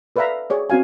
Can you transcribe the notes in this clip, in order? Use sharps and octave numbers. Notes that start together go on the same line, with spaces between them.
A4 B4 D5 E5 F5 A#5
G#4 C#5 D5
C4 C#4 F#4 F5 G#5